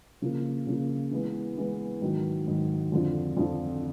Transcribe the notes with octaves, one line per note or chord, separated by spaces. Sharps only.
C#3 F3 A#3
C#3 F3 A#3
E3 G#3 B3
E3 G#3 B3
G#2 D#3 F#3
G#2 D#3 F#3
F2 D3 F3
F2 D3 F3